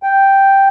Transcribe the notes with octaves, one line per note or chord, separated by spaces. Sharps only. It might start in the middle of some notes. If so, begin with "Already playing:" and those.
G5